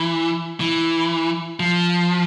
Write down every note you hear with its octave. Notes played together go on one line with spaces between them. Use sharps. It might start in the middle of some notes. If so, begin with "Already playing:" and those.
Already playing: E3
E3
F3